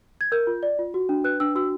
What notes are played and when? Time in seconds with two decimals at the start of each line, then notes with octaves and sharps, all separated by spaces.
0.21 G#6
0.32 A#4 G6
0.47 F4
0.63 D5
0.79 F4
0.94 F#4
1.09 D4
1.24 B4 F#6
1.40 D4 E6
1.55 F#4 E6